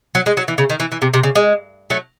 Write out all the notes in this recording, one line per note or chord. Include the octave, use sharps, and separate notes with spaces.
F#3
G#3
F#3
E3
C#3
D#3
E3
E3
C3
C3
C#3
G#3
F#3 A3